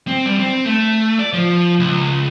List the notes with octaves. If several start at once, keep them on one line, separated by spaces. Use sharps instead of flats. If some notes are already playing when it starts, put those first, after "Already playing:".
C4
G3
C4
A3
D5
F3
C#2